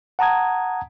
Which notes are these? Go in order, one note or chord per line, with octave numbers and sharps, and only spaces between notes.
F#5 A5 A#5 D#6 G#6